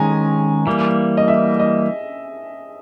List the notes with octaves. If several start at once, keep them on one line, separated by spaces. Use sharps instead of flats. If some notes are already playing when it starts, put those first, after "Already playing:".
Already playing: D#3 G#3 C#4 G#5 A#5
E3 G3 A#3
D#5
E5
D#5